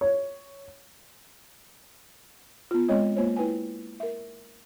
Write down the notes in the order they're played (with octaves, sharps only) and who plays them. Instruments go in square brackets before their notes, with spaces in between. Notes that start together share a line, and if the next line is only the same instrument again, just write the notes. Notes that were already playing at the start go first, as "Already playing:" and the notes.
[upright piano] C#5
[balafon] B3 F4
G#3 C4 C#5 D#5
A#3 F4 C5 C#5
E4 B4 G5 G#5
A#4 E5